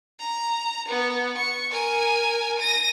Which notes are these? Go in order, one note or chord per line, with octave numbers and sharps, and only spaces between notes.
A#5
B3
C#6
A#4 G#5
A#6 D#7